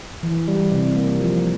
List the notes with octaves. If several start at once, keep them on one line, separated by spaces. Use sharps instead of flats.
E3
G3
C3
A#3
F3